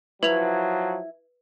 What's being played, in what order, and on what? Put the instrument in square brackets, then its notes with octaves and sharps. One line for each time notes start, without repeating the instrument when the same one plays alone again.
[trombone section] F3 F#3 [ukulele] E4 [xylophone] B4 F7